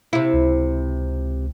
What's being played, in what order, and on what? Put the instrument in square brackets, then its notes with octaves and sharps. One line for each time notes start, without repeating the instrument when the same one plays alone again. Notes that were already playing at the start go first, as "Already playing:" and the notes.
[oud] C3 E4
[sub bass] C#2